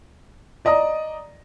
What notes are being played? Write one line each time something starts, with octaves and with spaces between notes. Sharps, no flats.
D5 D#5 A#5 D#6